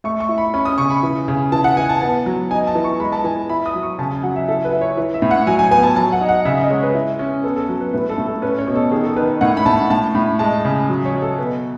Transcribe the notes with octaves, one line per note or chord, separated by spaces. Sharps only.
A3 C#6
C#6
E4
B5
C#4 B5
D#6
C#3 C#6
B5
E3
C#3
E3 A5
F#5
E3 G#5
A5
B3 A5
F#3
D#4 G#5
A5
E3
C#6
G#3 B5
A5
E3 G#5
E4 B5
D#6
F#3
C#6
C#3 A5
G#5
F#3 F#5
E5
E4 A4
B4
E4
C#5
E3
E5
A2
F#5
F#3 G#5
G#5
B3 G#5
A5
F#3 A5
F#5
D#4
F#5
C#3 E5
D#5
G#3 C#5
B4
E4
C#4
B3 A4
A4
F#3
B4
A2 B4
A4
A2
A4
C#4 B4
C#5
B2
A4
D#3 G#4
A4
D#3 B4
A2 F#5
B5
A2 A5
A2 A5
A2 B5
G#3 A5
C#3
F#3
C#5
F#3
A4
B2 B4